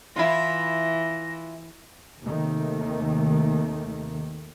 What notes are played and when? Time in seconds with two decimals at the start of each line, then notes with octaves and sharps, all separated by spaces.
0.16 E3 E4 F4 A#6
2.23 D#2 C3 D#3 A3